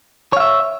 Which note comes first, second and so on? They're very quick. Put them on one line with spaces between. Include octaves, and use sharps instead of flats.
C#5 F5 E5